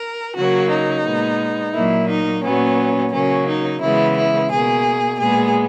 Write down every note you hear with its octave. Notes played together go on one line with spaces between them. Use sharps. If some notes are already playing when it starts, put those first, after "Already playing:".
Already playing: A#4
C#3 F#3 A#3 F#4
D#4
A#2 G#3 B3
A#2 F#3 A#3 E4
D#4
A#2 F#3 B3 C#4
C#3 F#3 A#3 C#4
D#4
C#3 E3 G#3 B3 E4
E4
B2 A#3 G#4
A#2 G#3 B3 G#4